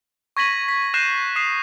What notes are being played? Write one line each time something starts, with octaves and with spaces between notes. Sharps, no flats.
C#6 G#6 A#6 B6 D#7 F#7
B6
F#6 G6 A#6 C7 D#7 E7
D#6 C7 E7